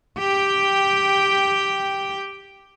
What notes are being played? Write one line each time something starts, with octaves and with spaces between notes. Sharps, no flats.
G4 G5